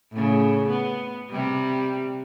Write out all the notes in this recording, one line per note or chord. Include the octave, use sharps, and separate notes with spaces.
A2 C#3
B3
C3 G3